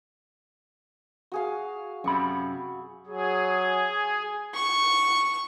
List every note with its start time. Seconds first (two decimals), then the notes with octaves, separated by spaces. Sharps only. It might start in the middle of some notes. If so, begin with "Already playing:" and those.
1.32 F#4 G#4 F5
2.04 F#2 C3 B5 C#6
3.07 F#3 G#4
4.54 C#6